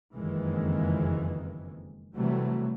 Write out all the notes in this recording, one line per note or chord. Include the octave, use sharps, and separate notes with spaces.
F#1 F2 D#3 E3 G#3
C3 E3 F#3 G3 A3